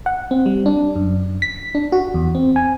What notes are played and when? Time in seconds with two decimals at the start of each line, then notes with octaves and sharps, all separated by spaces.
0.06 F#5
0.31 C4
0.46 G3
0.66 D4
0.96 F#2
1.42 B6
1.75 D4
1.92 F#4
2.14 E2
2.35 C4
2.56 G#5